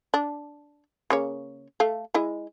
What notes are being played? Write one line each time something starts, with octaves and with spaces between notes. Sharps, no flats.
D4
C#3 A#3 C#5
A3 F5
G#3 E4 D#5